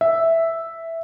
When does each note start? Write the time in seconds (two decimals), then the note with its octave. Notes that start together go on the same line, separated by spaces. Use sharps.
0.01 E5